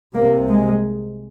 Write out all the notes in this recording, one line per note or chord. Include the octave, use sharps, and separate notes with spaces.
C2 C3 A#3
G#3